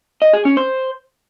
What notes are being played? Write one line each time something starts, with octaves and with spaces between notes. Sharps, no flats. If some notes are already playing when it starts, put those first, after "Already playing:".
D#5
G#4
C#4
C5